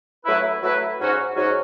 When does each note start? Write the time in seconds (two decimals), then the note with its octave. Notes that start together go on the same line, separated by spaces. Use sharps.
0.26 F#3 A3 E4 B4
0.62 F#3 A3 E4 B4
1.00 G#2 F#3 C#4 F#4
1.36 G#2 F#3 C#4 F#4